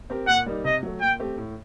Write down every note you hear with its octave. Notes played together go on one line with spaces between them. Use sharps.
C4 G4 A#4
A#2 F#5
G3 A#3 D#4
C3 D#5
F#3 A3
A#2 G5
A3 C4 G4
A2